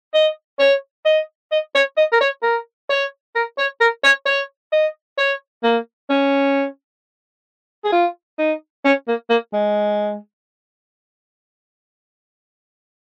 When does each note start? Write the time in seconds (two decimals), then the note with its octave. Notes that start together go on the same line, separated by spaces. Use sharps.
0.14 D#5
0.59 C#5
1.05 D#5
1.52 D#5
1.75 C#5
1.97 D#5
2.12 A#4
2.21 C#5
2.43 A#4
2.90 C#5
3.35 A#4
3.58 C#5
3.81 A#4
4.04 C#5
4.26 C#5
4.72 D#5
5.18 C#5
5.63 A#3
6.10 C#4
7.84 G#4
7.92 F4
8.38 D#4
8.85 C#4
9.08 A#3
9.30 A#3
9.53 G#3